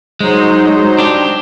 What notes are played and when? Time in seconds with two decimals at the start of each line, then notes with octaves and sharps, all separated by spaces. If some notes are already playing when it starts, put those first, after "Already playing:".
0.20 F#3 G#3 D#4 C5
0.99 D4 G4